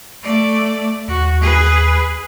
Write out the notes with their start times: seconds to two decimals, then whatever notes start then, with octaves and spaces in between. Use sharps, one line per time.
0.23 A3 D5
1.08 D#2 F#4
1.41 G#4 B4